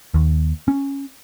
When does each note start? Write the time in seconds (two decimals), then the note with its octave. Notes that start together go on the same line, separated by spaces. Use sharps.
0.14 D#2
0.68 C#4